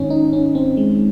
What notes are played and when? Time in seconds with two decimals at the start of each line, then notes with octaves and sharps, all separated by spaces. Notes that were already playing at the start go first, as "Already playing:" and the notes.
Already playing: G#2 D#3 C#4 D#4
0.10 D#4
0.33 C#4
0.55 C4
0.77 G#3